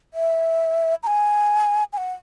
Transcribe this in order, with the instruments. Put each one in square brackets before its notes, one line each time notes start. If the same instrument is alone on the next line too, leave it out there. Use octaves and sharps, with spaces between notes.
[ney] E5
A#5
G#5
G#5
F#5